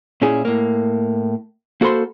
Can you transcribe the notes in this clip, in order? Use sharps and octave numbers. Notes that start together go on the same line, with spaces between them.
A#2 C#4 E4 G#4
A2 A#3
A#3 F#4 A4 C5 B5 C6